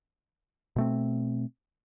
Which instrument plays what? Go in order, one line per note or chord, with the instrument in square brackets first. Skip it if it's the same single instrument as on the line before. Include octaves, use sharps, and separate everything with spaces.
[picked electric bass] B2 A3 C4